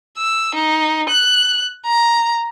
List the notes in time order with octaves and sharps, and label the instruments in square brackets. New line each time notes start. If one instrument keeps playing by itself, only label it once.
[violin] E6
D#4
F#6
A#5